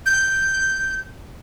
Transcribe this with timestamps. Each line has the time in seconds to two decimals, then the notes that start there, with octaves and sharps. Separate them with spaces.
0.06 G6